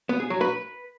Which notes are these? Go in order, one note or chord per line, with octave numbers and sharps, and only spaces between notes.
B3
G#4
F#3
B4